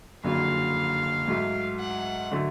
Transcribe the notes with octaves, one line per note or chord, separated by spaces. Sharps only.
F#1 F2 D3 F#3 F5
G#2 F#3 A3
F#5
D3 F#3 A3